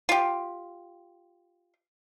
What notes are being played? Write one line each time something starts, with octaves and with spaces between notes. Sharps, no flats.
F4 G4